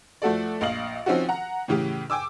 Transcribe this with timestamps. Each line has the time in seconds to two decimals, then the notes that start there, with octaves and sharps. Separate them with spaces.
0.22 F3 A3 F#4 A4 D5
0.61 A#1 D#5 F5 F#7
1.06 F3 C4 C#4 D#4 F4 F#4
1.29 F#5 A#5
1.68 A2 C#3 E3 G4
2.10 G5 G#5 D6 E6